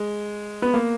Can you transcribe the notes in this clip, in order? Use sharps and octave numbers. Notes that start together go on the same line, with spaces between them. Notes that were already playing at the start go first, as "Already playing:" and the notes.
Already playing: G#3
B3
A#3